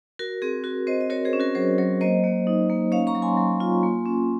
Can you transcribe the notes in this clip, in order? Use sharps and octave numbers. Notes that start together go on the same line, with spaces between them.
F#4 A#4
C4 G#4
F#4 A#4
C4 C5 D#5
D#5
F#4 A#4 C#5
G#4 C5
C#4
F#4 A#4
F#3 G#4 C5
F#3 A#4 C#5
A#3 C5 D#5
A#3
D#4
A#3
C#4 C#5 F5
A#5 C#6
F#3
G#5 C6
F#3
F4
A#3
C#4